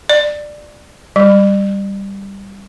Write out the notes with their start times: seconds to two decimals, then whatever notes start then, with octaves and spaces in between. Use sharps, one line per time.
0.09 D5
1.16 G3